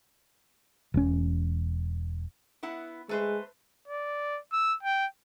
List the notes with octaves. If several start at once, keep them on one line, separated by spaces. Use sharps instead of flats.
E1 C#4
B3 E4 F#5
G#3 A3 B4 C5
D5
E6
G5